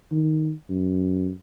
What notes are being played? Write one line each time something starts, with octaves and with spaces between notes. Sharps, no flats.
D#3
F#2